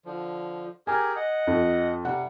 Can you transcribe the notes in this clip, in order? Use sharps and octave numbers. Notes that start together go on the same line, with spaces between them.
D3 F3
G4 G#4 A#4 G#5
D#5 F#5
F2
C3 G3 F#5